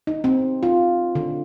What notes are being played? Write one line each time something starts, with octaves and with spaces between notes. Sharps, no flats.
D#4
C4
F4
D3